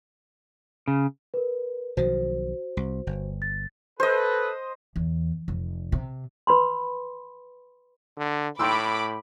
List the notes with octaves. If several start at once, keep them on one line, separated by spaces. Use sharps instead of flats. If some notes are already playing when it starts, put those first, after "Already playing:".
C#3
A#4 B4
B1 D#3 F3 F#4 C5
C2
G1
A6
A4 B4 C5 D#5
E2
F1
C3
B4 B5 C6
D3
A2 G5 B5 C6 D6 E6